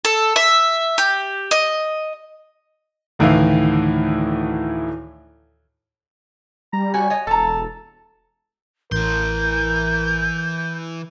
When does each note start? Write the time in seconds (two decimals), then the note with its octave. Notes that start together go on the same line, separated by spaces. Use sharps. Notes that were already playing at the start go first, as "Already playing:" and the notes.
0.05 A4
0.36 E5
0.98 G4
1.51 D#5
3.19 D2 A2 D#3 E3 E4 F5
6.73 G3 A#5
6.94 F#4 C#5 G#5
7.10 C#5 D#5
7.27 E1 A4 A5 A#5
8.92 A1 E3 A#4 C6 G6